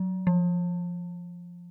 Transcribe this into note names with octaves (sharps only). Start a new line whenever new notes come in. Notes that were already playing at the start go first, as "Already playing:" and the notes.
Already playing: F#3
F3